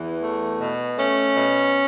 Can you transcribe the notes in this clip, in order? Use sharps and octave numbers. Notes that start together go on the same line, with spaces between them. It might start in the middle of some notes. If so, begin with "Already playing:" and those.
Already playing: E2 E3
A3
B2
A3 C#4
B2